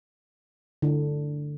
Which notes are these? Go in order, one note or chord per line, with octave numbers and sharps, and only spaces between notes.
D3